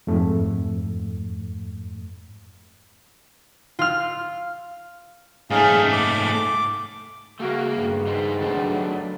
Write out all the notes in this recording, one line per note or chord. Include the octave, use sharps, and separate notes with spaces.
F2 G#2 A3
F4 F6
G#2 A3 C#4 G#4 F5
D6
C#3 A3 A#3 F#4 F5
G2 D#3 G3 G#3 B3
D#4 C5
F#3 A3 D4 A5